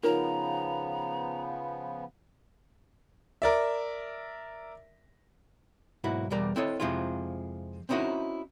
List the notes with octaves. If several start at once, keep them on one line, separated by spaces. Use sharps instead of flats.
C#3 F3 B3 D#4 F4 A#4 C#5 A#5
A#4 D5 E5
B1 G#2 A#3 E4 F#4
E2 B2 G3 A#4 D5
C4 E4 A4 C#5 D#5
F2 C3 F3 G#3 E4 F4
C4 C#4 D#4 E4 F#4 A#4